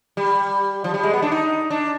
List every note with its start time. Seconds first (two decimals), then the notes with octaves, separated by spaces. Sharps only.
0.17 G3
0.84 F3
0.94 G3
1.03 G#3
1.14 B3
1.22 D4
1.32 D#4
1.70 D4